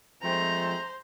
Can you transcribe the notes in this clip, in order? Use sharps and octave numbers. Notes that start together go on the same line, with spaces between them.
F3 G#3 A3 C4 C5 A#5